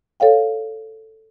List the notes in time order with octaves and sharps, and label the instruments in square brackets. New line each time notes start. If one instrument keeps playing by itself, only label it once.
[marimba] A4 C#5 F5 G5